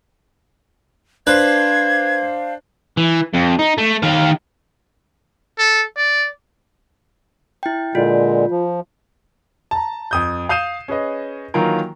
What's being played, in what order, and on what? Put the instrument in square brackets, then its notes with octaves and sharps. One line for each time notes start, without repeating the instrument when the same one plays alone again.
[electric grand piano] D4 C5 [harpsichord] B4 [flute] F5 [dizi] G#6
[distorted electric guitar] E3
F2
D#4
A3
D#3 F5
[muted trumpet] A4
D5
[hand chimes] E4 G5
[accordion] A#2 D3 G#3 [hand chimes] F4
[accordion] F3
[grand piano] A5 A#5
F2 D#6 G6
F5 D#6 G6 C7 D#7 E7
C#4 G#4 B4 D#5
D#3 E3 F#3 A#3 F4 A#4